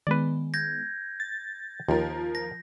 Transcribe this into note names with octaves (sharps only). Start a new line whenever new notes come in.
D#3 G#3 B3 B4 D5
G6 G#6 A#6
A6
D#2 F3 A#4
A#6